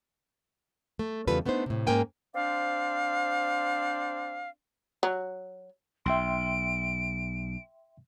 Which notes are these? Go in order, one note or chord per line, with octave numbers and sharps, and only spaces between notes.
A3
E2 C#3 G3 F4 A4 B4
A3 B3 D4 D#4 C5
A2 C3
G#2 A#3 C#4 A#4 G5 G#5
C4 D4 C5 D5 F5
F#3
B1 E5 G5 C6 D7